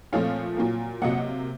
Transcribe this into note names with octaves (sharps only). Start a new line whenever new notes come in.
A#2 F3 A3 C4 C#5 F5
A#2 F#3 A#3
C3 F#3 A#3 D#5 F#5